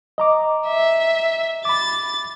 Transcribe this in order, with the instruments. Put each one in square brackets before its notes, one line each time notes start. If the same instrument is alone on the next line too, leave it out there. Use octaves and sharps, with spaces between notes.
[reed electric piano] D#5 A#5 D6
[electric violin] E5
[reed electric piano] B5 D6 [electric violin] A6